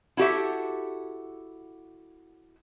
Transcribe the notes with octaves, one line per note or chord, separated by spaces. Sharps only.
E4 F#4 G4 A4 E5